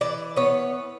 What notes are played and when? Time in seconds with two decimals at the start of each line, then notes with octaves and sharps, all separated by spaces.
0.01 E3 D5
0.36 B3 C#5